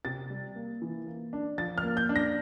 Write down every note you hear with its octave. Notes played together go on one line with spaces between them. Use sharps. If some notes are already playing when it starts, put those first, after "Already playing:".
C3 A6
G3
A#3
E3
A#3
D4
F3 A6
F6
A#3
G6
D4
A#6